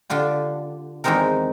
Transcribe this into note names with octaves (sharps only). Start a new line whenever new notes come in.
D3 D4 F4 G4
E2 D#3 G#3 C4 D#4 A#4